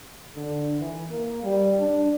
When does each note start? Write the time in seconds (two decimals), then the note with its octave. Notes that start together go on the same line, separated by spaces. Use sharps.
0.35 D3
0.78 E3
1.10 A#3
1.43 G3
1.78 D4